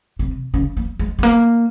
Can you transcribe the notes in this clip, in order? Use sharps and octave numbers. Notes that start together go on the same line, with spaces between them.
C3
C#3
A#3
G#3
G#3
A#3